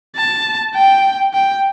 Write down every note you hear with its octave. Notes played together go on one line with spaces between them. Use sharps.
A5
G5
G5